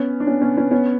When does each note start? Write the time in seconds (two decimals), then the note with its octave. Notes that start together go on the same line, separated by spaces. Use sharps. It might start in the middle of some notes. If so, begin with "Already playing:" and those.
Already playing: B3 C#4
0.20 D4
0.27 B3 C#4
0.42 B3 C#4
0.56 B3 C#4
0.71 B3 C#4